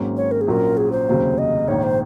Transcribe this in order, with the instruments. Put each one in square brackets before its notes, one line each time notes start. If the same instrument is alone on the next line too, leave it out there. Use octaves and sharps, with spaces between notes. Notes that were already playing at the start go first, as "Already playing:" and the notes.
Already playing: [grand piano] G#1 G#2 F#3 A#3 C#4
[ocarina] C#5
A#4
G#4
[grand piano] A#1 A#2 F#3 C#4 F4 [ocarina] A#4
[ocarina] G#4
C5
[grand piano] F1 D#2 C#3 F#3
[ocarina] D#5
[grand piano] A#1 G#2 D#3 A#3 [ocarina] C#5
[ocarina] C5